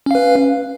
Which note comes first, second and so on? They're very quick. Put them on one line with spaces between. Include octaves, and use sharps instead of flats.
C#4 F5 B4